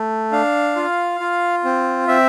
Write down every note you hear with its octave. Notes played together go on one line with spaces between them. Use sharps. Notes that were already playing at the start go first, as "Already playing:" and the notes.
Already playing: A3
D4 F5
F4
F4
C4
C4 E5